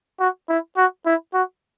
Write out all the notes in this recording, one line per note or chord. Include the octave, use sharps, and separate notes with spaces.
F#4
E4
F#4
E4
F#4